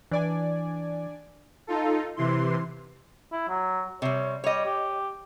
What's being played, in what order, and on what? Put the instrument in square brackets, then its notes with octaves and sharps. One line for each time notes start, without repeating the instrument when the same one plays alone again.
[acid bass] E3 [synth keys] D4 D5 G#5
[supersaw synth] D#4 F4 A4
C3 E3 C6
[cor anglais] E4
F#3
[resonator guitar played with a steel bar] C3 G3 [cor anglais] C#5
[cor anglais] G3 [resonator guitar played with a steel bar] C#5 D#5
[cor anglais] G4